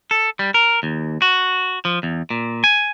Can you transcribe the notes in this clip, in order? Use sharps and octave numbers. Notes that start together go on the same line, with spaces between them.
A4
G3
A#4
D#2
F#4
F3
E2
A#2
G#5